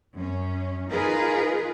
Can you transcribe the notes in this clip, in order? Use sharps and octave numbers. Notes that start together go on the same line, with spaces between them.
F#2 C#4
D#4 F4 G#4 A#4 B4